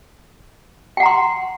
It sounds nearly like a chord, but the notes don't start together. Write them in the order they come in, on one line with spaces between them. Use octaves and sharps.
G5 F#5 A#5 C6